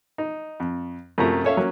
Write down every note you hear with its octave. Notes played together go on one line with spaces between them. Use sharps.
D#4
F2
F#2 C3 F3 A3 A#5
C#4 A4 C#5 E5 F5
F#3 A#3 C#4